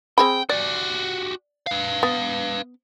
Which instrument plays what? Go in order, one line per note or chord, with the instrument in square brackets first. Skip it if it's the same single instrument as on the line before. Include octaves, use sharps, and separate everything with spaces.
[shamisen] C4 G#4 B5 [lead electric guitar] G5
[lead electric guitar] F#4 G4 [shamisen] D5
[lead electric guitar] B4 F5
[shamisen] B3